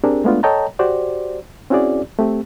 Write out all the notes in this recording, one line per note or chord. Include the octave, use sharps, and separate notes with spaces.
C4 D4 G4 G#4 A#4
G#3 A3 B3 D4 F4
A4 C#5 D#5 G5 A5 A#5
F#4 G4 C5 D5
C4 C#4 E4 F#4 G#4 D5
A3 C4 G4